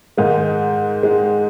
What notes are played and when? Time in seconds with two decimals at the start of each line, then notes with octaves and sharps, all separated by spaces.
0.17 G#2 D#3 G#3
1.03 G#3